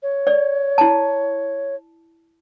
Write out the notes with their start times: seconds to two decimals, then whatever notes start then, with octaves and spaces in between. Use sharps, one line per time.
0.03 C#5
0.27 D5
0.78 E4 A5